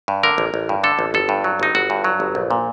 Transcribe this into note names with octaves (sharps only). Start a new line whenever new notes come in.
G2
D3 A#4
A1
A1
G2
D3 A4
A1
G1 A4
G2
F#3
G1 D#4
G1 F#4
G2
F#3
G1
A#1
A#2